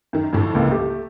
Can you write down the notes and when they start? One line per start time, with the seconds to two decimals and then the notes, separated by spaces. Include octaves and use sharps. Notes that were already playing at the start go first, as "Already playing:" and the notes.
0.13 F#2 D#3
0.33 F2 A2 D3
0.55 C#2 A#3
0.72 A3 G4